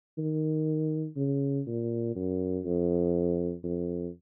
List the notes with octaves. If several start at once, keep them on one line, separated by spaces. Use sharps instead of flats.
D#3
C#3
A#2
F#2
F2
F2